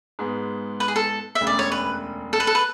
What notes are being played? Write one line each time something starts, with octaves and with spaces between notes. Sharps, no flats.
G#2 G#3 B3
B4
G#4
A4
E5
E1 D2 C#3
D5
C#5
B4
A4
B4
A4
B4